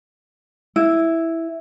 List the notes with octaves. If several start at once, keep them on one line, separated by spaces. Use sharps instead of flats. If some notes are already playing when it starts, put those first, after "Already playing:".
E4